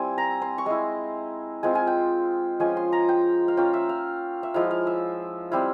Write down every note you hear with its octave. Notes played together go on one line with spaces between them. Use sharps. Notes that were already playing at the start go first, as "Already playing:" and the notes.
Already playing: G3 C4 E4 G#5
A#5
C6
C#6
G#3 E4 C6
G#3 C4 F4 G#5
G#5
G5
F3 G#3 C#4 G#5
C6
A#5
G5
F5
A#3 C#4 F4 G5
E5
F5
E5
F3 G#3 E4 F5
F5
E5
G3 C4 E4 F5